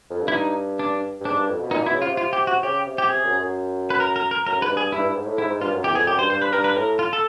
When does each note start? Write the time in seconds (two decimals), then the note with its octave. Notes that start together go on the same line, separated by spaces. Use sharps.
0.10 F2
0.21 G2
0.28 E4
0.33 D#4
0.79 D4
1.21 G2
1.25 G#2 D4
1.37 G2
1.49 F2
1.60 B2
1.71 A#2 D#4
1.82 B2 E4
1.93 C#3
2.02 F4
2.06 C3
2.17 F4
2.33 G4
2.47 F#4
2.59 C3
2.63 C#3 G4
2.86 C3
2.98 G4
3.09 C3 G#4
3.24 F#2
3.39 F#2
3.90 B4
4.00 A#4
4.16 A#4
4.31 A#4
4.46 F#2 A#4
4.60 G#2 B4
4.70 G2
4.77 G#4
4.92 G2 E4
5.04 G2
5.16 G#2
5.26 A2
5.38 G#2 E4
5.50 G#2
5.61 G2 F4
5.73 F#2
5.84 E2 G4
5.95 F2 G#4
6.07 F#2 G4
6.18 G2 C5
6.30 G2 C5
6.42 B4
6.53 G2 A#4
6.64 B4
6.76 A2 A#4
6.99 F4
7.13 A4